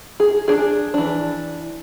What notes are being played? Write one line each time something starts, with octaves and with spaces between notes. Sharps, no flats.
G#4
D4 G#4
E3 D4